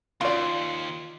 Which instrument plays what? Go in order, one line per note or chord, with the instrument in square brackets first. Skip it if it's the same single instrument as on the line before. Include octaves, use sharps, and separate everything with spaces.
[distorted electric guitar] D#2 [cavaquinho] F4 [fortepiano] D5 C6